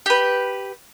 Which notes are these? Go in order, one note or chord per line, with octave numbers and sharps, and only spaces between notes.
G4 B4